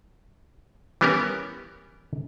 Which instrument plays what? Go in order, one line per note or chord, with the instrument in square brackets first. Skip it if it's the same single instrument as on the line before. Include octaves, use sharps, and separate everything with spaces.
[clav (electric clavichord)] E3 G3 B3 C#4 G4 A#4